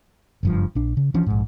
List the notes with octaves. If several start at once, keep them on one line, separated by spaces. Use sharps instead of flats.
F#1 G2 F3
A#1 D4
C#3
E3 F3 C#4 D4
A#1 G#2